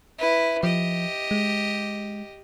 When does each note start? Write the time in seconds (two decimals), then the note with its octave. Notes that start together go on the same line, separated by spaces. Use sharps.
0.18 E4 B4
0.63 F3 G4 D#5
1.31 G#3